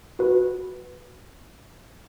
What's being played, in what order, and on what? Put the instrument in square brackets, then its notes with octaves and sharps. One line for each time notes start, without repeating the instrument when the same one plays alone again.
[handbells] F#4 B4